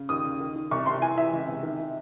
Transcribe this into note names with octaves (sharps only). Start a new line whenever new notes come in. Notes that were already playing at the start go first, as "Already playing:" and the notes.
Already playing: C#3
D#2 D#6
C#3
D#3
D#3
C2 C#6
C3 C6
E3 G#5
E3 E5
C#2
C3
D#3
D#3